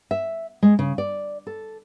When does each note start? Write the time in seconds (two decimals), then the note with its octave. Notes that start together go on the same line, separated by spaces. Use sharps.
0.11 E5
0.63 G#3
0.79 C#3
0.98 D5
1.47 A4